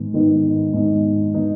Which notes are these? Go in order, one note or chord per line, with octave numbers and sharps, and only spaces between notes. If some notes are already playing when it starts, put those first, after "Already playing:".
Already playing: G#2 D#3 B3
G#2 D#3 B3 D#4
G#2 D#3 B3 D#4
D#3 B3 D#4